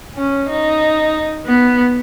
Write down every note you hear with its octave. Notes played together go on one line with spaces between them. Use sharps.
C#4
D#4
B3